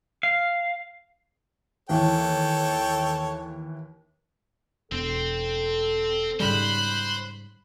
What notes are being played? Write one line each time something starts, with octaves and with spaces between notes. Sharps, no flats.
F5
D#2 E3 A4 C#5 G5
E1 C4 A4 C5
G#2 C#3 G3 C5 B5 F#6